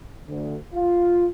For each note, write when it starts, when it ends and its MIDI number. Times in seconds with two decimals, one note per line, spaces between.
0.28 0.56 38
0.75 1.27 65